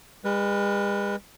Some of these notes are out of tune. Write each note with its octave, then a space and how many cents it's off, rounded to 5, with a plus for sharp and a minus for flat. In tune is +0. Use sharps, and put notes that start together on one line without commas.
G#3 -45 B4 -20